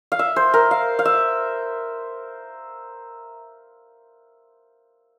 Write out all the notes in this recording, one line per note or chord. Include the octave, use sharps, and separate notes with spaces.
F5
E5
C5
A#4
F5
F5
E5